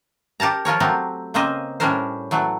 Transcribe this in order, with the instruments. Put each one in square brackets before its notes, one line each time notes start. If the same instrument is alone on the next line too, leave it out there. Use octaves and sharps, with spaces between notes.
[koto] G4 A#4 A5 A#5
F3 F4 A#4 C#5
F#3 A3 C4 G4 A#5
C#3 A#3 C4 C5 D#5
A2 G3 C#4 D4 A#4 C5
E3 F#3 A3